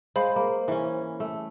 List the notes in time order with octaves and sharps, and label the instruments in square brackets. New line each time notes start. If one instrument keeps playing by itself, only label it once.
[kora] G#3 [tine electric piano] C5 [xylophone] F5 B5
[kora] A#3
E3 C#4
A3